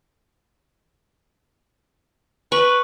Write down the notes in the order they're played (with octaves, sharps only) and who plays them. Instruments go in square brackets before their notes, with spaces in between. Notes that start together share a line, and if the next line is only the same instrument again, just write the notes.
[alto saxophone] B4 [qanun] C#6